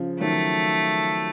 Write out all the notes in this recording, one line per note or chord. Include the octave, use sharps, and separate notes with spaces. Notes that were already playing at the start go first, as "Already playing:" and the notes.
Already playing: C#3 F3
D#3 F#3 A3